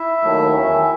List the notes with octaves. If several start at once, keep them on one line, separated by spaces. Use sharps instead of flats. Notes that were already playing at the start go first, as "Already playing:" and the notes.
Already playing: E4 E5
D#2 D#3 F#3 A3
E2 D#3 F#3 C#4